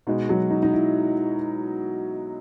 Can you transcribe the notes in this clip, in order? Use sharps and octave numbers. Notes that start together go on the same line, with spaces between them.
B2 G#3 D#4
F#3 F#4
D#4
D#4
E4